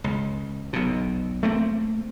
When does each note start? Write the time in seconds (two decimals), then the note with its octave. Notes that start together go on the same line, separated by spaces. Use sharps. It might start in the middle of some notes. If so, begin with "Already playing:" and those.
0.04 C#2
0.73 B1 B2
1.43 A3 A#3 C4